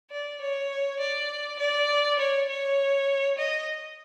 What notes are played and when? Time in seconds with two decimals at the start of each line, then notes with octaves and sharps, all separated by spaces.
0.11 D5
0.41 C#5
1.00 D5
1.59 D5
2.19 C#5
2.48 C#5
3.38 D#5